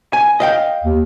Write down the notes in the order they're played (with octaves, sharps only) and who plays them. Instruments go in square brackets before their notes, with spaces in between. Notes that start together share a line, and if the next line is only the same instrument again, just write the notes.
[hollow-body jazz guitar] G#5
D#5 F5 G5
[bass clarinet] D#2